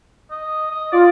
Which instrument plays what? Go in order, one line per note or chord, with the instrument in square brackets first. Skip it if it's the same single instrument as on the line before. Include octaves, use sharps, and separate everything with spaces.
[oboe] D#5
D#5
[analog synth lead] F4 [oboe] D5